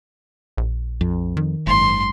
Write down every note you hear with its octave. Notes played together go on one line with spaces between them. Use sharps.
A#1
F2
D#3
F#1 G#2 C6